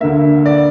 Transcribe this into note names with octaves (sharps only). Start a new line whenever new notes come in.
D2 D3 A#3 E5
D5